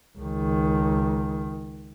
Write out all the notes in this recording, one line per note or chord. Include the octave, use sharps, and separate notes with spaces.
C#2 D#3